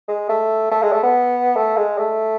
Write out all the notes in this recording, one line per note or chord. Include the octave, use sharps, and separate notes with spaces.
G#3
A3
A3
G#3
A3
B3
A3
G#3
A3